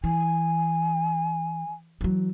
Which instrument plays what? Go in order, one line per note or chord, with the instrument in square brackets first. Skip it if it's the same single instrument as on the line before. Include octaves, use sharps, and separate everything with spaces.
[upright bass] E3 [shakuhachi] G#5
[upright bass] E3 F#3